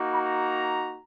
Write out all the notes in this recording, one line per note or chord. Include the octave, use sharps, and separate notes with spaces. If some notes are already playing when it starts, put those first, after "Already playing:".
Already playing: A#3 D#4 F#4
A#5